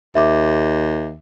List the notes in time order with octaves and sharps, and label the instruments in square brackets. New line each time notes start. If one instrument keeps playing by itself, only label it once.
[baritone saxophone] D#2 [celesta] E5 D6